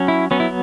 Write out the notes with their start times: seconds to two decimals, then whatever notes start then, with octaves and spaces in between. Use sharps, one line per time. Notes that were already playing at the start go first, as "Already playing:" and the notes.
Already playing: F#3 C#4
0.08 E4
0.31 F#3 B3 C#4
0.40 E4